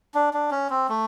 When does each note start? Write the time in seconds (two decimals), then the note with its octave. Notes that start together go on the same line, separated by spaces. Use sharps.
0.15 D4
0.34 D4
0.51 C#4
0.70 C4
0.89 A3